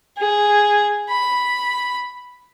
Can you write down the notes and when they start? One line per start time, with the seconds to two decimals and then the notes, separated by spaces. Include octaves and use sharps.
0.18 G#4
1.09 B5